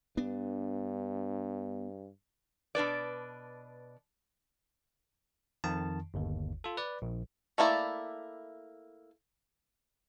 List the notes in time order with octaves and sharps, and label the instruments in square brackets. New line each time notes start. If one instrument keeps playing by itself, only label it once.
[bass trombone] G2 [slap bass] B3 D4
[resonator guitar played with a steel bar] B2 D4 B4 D5
[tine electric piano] F2 D#3 A5
G1 D#2
F4 A4
B4 D5
A#1
[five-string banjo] A3 A#3 E4 D5